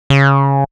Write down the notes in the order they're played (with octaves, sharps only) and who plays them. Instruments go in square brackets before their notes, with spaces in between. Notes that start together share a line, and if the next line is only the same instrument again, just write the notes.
[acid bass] C#3